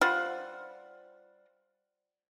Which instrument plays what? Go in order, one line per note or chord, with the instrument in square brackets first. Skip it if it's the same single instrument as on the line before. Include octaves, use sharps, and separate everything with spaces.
[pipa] G3 F4 C5 F#5